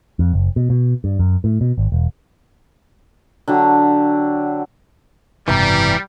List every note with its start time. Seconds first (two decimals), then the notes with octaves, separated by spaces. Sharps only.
0.19 F2
0.33 F#1
0.56 B2
0.70 B2
1.04 G2
1.19 F#2
1.44 A2
1.61 B2
1.78 G#1
1.92 E1
3.48 D3 F#3 G4
5.48 F#1 G#2 C3 E3 G3 E5 A#5